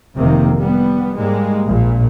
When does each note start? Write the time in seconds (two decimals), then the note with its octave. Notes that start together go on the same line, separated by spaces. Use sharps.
0.17 F1 C3 D#3 A#3
0.58 G3 B3
1.15 G#2 G3 G#3 A#3
1.68 A#1 A#2